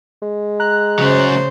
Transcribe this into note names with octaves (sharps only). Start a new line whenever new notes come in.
G#3
A#5 F#6
C#3 F#3 C#4 C5